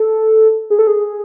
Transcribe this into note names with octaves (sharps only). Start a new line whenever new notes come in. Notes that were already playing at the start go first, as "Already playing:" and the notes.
Already playing: A4
G#4
A4
G#4